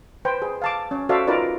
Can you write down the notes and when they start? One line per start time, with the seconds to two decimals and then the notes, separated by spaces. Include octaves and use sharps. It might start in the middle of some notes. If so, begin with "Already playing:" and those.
0.25 B4 C5 G5
0.42 G#4
0.62 F5 A5 D6
0.91 C#4
1.09 F#4 A4 C5 D5 E5 F5
1.27 D#4 F4 A#4 B4 D5